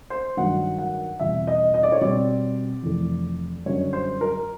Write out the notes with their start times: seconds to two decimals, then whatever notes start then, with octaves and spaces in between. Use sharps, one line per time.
0.10 C5
0.37 G2 D#3 F#3 F#5
0.78 F#5
1.19 E2 B2 G3 C4 E5
1.47 D#5
1.74 D#5
1.83 D5
1.92 C#5
2.01 B2 G3 C4 D5
2.83 F2 C3 E3 A3
3.66 F#2 D3 G3 C#5
3.93 C5
4.21 A#4